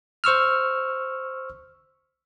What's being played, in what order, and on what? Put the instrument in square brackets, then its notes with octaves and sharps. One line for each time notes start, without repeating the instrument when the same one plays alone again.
[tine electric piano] C5 C#6 E6 F6